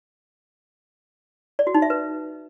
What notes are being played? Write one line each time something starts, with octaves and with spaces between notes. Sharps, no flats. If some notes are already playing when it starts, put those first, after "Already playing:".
D5
F#4
D#4
E5
B4